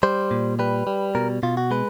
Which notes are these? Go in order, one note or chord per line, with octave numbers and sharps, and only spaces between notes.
G3 C5
A#2
G3 B4
G3
B2 A#4
B2 F4
F#4
G#3 B4